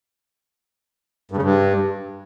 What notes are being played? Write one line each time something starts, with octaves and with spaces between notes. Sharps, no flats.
G2
C#3
G2